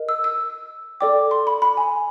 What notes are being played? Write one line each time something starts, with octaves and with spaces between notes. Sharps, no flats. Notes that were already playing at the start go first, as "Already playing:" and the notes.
Already playing: A#4 D#5
E6
E6
A4 D5 G5 D6
C6
B5
B5
G#5